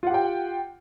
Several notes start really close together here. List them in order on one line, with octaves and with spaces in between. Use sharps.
F4 F#5 G4 G5